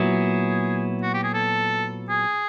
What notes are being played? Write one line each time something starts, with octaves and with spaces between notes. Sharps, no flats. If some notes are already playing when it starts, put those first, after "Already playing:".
Already playing: A#2 F#3 B3 E4 G#4
F#4
G4
G#4
A4
G#4